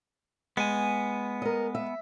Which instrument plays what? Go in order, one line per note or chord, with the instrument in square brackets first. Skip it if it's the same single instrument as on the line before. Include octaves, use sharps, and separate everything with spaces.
[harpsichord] G#3 [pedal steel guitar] B3 G#5
[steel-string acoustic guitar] A#4 D#5
E5